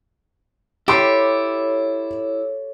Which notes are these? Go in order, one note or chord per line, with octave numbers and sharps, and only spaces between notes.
E4 G4 A4 C#5 B5 C6